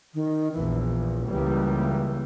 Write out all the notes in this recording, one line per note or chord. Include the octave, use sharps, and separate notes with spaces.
D#3
A#1 E2 E3
E3
C#2 E3 G3 A#3